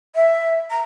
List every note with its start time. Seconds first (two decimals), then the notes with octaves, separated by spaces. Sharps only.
0.15 E5
0.70 A#5